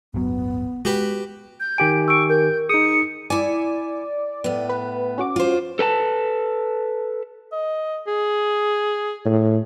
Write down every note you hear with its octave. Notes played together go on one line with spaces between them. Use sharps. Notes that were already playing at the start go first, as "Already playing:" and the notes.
D1 G1 F#3 B3
G#3 F#4 G4 B4
G6
D#3 G4 G#5 D7
C#6 E6 D7
A#4 G6
D#4 G#4 D#6 C#7
E4 D5 G#5
A2 B3
B4
C#4 F#4 D6
F4 C5
A4 B4 G#5 A5
D#5
G#4
A2